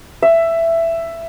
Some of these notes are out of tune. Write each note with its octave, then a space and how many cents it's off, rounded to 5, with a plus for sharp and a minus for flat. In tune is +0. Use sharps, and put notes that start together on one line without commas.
E5 +10